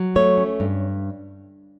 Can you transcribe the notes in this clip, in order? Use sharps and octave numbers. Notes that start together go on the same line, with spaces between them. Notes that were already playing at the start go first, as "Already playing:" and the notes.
Already playing: F#3
A3 C#5
C#4
G2